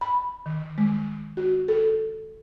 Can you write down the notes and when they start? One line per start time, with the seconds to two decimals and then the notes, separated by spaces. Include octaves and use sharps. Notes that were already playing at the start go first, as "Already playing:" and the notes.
0.01 B5
0.46 D#3
0.78 G#3
1.37 F#4
1.68 A4